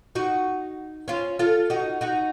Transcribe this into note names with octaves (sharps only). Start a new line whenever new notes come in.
D#4 F#4
C#4 F4
F4 A4
D#4 F#4
D#4 F#4